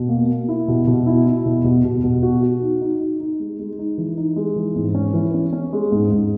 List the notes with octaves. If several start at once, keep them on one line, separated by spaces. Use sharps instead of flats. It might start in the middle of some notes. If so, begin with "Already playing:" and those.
Already playing: B2
A#3
A#3
E4
B2
B2
E4
E4
B2
B2
B2
B2
F#4
F#4
D#4
D#4
D#4
D#4
G#3
G#3
D#4
E3
D#4
G#3
E3
G#2
C#4
E3
C#4
C#4
G#3
G#2
G#2